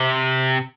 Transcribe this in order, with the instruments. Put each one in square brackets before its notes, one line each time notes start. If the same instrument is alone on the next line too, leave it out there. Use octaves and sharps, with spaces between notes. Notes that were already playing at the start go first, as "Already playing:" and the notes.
Already playing: [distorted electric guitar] C3